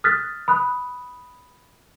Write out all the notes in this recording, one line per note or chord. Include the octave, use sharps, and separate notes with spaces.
D#6 F6 F#6 A6 B6
B5 D#6 F#6